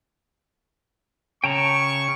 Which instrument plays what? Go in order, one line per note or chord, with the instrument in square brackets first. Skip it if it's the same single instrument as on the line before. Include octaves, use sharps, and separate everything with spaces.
[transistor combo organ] C#3 [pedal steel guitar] G5 A5 A#5 [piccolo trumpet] C#6